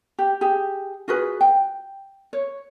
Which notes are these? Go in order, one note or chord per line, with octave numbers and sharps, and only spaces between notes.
G4
G4 G#4
F4 F#4 G#4 B4
G5
C#5